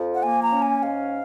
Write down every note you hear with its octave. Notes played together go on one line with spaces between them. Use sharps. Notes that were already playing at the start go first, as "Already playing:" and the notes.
Already playing: F2 F3
F#5
A#3 G#5
A#5
C#4
G#5
G#2 F5